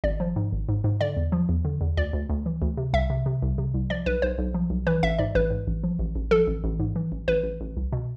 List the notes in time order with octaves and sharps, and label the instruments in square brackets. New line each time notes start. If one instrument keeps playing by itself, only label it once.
[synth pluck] G#1 D5
F3
G#2
G#1
G#2
G#2
D3 D5
E2
F3
E2
D3
E2
D2 D5
D2
D2
E3
D2
C3
C2 E5
C3
C3
C2
C3
C2
F3 D5
B1 B4
B1 C5
B1
F3
B1
E3 B4
A1 E5
G#2 D5
A1 B4
G#2
A1
F3
A1
A1
F3 A4
A1
A1
G#2
E3
A1
A1 B4
A1
A1
C2
B2